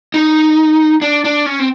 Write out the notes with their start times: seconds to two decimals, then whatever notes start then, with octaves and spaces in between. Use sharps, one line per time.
0.14 D#4
1.02 D4
1.24 D4
1.46 C#4
1.59 C4